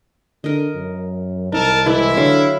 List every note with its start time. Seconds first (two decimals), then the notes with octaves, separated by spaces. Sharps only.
0.44 D3 A#4 D#5
0.75 F#2
1.52 C2 D#4 A4 A#4 A5
1.86 E3 G#3 E4 D5
2.17 D3 F#3 F5 D6